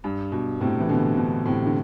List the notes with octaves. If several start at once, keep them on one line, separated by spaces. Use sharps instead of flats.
G2
G2 B2
A2 C3
E3
B2 D3
B2 D3
A2 C3
D3